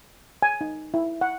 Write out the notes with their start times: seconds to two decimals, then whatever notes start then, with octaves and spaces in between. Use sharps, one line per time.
0.42 G#5
0.61 D#4
0.94 E4
1.21 F#5